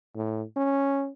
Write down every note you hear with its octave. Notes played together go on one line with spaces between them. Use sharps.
A2
C#4